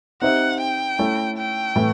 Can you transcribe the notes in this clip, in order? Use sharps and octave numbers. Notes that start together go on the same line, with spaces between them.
C4 D#4 G4 C5 E5 F#5
G5
A3 C#4 E4
G5
A2 E3 A3